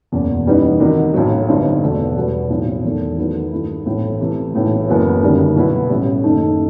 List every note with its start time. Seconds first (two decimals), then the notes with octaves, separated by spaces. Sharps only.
0.12 F#1 E2 B2 F#3 B3
0.46 F#2 E3 G3 B3 D#4
0.80 C3 D#3 G3 D#4 F#4
1.14 B1 A2 F#3
1.48 G1 G2 F#3 C4 D#4
1.82 E2 B2 A3
2.16 E2 B2 G3 B3 F#4
2.50 B1 A2 F#3 C4 E4
2.84 E1 E2 D#3 A3
3.18 D#3 F#3 B3 E4 A4
3.52 G2 D#3 A3 E4
3.86 B1 A2 E3 A3 C4
4.20 C3 E3 A3
4.54 B1 A2 E3
4.88 F#1 F#2 F#3 B3 E4
5.22 G1 F#2 D#3 G3
5.56 B1 B2 F#3 B3 E4
5.90 A1 A2 G3
6.24 F#1 F#2 D#3 A3 D#4